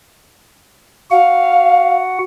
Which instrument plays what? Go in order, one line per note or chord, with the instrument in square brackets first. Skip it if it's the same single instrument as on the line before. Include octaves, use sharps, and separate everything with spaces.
[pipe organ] F#4 F#5 [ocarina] F5